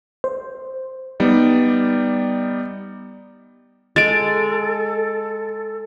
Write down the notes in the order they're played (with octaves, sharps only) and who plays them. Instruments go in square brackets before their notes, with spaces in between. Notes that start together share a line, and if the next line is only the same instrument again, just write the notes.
[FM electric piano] C5
[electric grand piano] G3 B3 D#4 D5
[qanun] G#3 G#5 [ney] A4 [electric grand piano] A6 D7